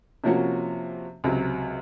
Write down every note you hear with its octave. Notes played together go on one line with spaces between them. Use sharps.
C3 F3 A#3 C#4 F#4
C#2 C3 F#3